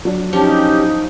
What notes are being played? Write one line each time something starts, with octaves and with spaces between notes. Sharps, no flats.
F#3 D4
F3 C#4 D#4 G4